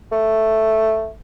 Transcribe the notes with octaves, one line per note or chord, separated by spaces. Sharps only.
A3